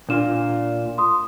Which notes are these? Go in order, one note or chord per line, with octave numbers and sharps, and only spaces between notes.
A#2 D4 F4 E7
C6 D#6